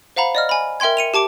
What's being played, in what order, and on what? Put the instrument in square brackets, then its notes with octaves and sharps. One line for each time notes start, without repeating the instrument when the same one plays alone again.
[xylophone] C5 F5 F#5 A#5 B5
D5 D#5 F6
G#5 B5
A#4 E5 G5 C6 G#6
C#7 D#7 F7
G4 A5 D6 D7